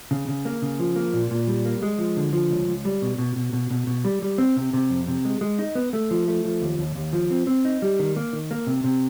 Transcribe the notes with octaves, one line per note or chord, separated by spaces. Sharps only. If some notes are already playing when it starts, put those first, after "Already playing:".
C#3
C#3
A#3
C#3
F3
A#3
A#2
A#2
G3
A#3
G#3
F3
D3
F3
C#2
C#2
G3
B2
B2
B2
B2
B2
B2
G3
G3
C4
C3
C3
F2
C3
G#3
G#3
D#4
B3
A3
F3
A3
F3
D#2
D#2
D#2
F3
C4
C4
D#4
G3
D#3
A#3
D#3
A#3
C3
C3